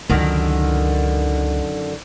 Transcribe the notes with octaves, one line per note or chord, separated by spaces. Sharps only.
C#2 F#2 D3 D#3